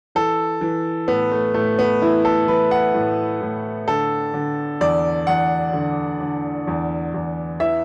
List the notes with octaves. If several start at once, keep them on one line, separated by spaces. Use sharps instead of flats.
E3 A4
E3
A2 B3
A3
A2 A3
B3
E3 E4
A4
E3 B4
F#5
A2
A2
D3 A4
D3
E2 D5
E2 F#5
D3
D3
E2
E2
E3 E5